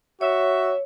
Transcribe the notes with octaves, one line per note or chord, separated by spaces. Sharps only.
F#4 C#5 E5